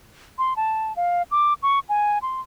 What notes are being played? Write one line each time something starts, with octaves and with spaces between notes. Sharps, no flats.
C6
A5
F5
D6
C#6
G#5
C6